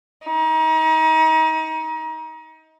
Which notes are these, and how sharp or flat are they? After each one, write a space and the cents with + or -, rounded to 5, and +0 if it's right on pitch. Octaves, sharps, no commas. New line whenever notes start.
D#4 +30